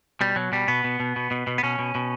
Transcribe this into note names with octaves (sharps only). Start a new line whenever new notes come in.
B2 G3
B2 F#3
B2 G3
B2 B3
B2
B2
B2
B2
B2
B3
B2 C#4
B2
B2